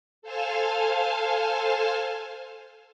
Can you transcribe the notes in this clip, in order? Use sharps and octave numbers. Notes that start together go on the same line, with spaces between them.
A4 C5 F5 G#5 A5 F6